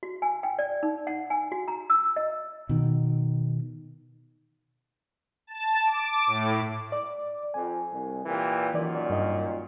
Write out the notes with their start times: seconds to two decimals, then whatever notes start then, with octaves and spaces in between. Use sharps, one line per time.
0.03 F#4
0.22 G#5
0.43 G5
0.59 D5
0.83 D#4
1.07 F#5
1.30 G#5
1.52 F#4
1.68 A#5
1.90 E6
2.16 D#5
2.69 B2 D#3
5.47 A5
5.84 D6
6.26 A2
6.92 D5 D6
7.54 F2 G#5
7.91 C2
8.24 A#2 E3 G4
8.74 F#2 A#2 D#3 E3 D5
9.10 G2 D#5